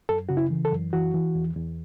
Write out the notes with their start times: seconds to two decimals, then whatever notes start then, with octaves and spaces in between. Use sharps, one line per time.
0.09 F#2 A4
0.29 C#3 F#4
0.37 E4
0.50 E3
0.65 A4
0.72 F#2
0.93 E3 F#4
1.14 E3
1.35 E2
1.56 E2